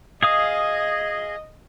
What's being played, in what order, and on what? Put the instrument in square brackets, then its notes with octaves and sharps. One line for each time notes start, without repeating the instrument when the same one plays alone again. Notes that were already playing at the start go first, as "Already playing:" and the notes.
[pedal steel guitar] G#4 F5 D#6 [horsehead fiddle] D#5